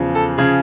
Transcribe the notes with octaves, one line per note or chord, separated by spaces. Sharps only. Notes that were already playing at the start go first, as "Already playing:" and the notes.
Already playing: E2 C#3 F3
A4
C#3 F3 G#4